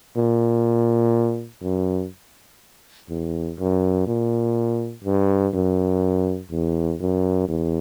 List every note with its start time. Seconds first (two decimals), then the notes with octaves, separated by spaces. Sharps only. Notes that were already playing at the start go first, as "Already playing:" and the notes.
0.16 A#2
1.63 F#2
3.09 E2
3.58 F#2
4.07 A#2
5.04 G2
5.53 F#2
6.50 E2
7.00 F#2
7.48 E2